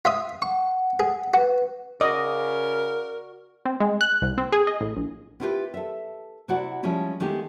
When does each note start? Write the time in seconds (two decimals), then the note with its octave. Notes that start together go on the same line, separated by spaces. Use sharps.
0.05 F4 E5 D#6
0.42 F#5 C#6
1.00 G#4
1.34 F#4 B4
2.01 C#3 F#4 A#4 D5 D#5
3.65 C4
3.80 G#3
4.01 F#6
4.22 C2
4.38 C4
4.52 G#4
4.67 D#5
4.81 A1
4.97 A#1
5.40 B3 C4 E4 F4 G4 B4
5.74 A4 E5
6.48 C3 E4 F#4 D5 F#5
6.83 F3 G3 G#3 C#4 E4 F4
7.20 D#3 G#3 A3 B3 D#4 G4